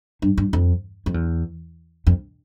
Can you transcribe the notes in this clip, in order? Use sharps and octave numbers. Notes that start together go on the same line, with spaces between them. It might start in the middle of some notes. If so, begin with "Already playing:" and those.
G2
G2
F2
F2
E2
F2